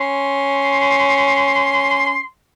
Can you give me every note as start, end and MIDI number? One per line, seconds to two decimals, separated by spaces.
0.01 2.20 61
0.01 2.24 84